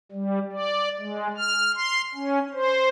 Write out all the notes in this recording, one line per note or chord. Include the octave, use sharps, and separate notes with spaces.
G3
D5
G#3
F6
C6
C#4
C5